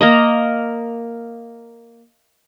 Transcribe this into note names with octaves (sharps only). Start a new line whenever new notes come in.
A#3 A#4 D#5